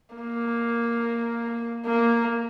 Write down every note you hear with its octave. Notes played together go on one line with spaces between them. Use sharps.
A#3
A#3